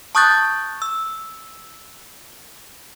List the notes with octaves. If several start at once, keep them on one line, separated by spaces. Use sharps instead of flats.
A5 C#6 D#6 F#6 G6 A6
E6